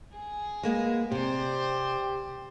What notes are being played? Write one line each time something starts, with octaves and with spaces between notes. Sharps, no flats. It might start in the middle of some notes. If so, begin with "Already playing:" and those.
G#4
G#3 A#3 B3
C3 G4 C5 D5